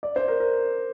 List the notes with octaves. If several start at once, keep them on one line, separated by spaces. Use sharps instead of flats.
D5
C5
A#4
A#4